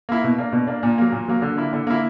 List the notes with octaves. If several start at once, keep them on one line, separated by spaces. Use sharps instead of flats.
A#3 E4
B2
A#3 D4
B2
A#3 D4
A#2
F#3 A#3
A#2
F#3 A#3
D3
A#3 E4
D3
A#3 E4